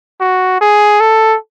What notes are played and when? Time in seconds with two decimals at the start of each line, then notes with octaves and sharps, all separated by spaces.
0.21 F#4
0.61 G#4
1.00 A4